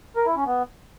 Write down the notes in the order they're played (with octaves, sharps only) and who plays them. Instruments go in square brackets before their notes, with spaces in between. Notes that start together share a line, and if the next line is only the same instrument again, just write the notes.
[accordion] A#4
E4
C#4
B3